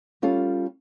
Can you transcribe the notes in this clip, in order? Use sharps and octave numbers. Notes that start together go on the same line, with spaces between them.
G3 C#4 F4 A4